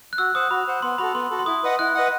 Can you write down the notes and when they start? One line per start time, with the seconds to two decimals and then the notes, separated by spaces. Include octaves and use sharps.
0.13 F#6
0.18 F#4 E6
0.35 C5 F#5 D#6
0.50 F#4 B5
0.67 C5 F#5
0.82 B3 C6
0.98 F#4 A4 B5
1.14 B3 C6
1.30 F#4 A4
1.39 C6
1.46 E4 D#6
1.63 B4 D#5 F#5
1.79 E4 F#6
1.95 B4 D#5 F#5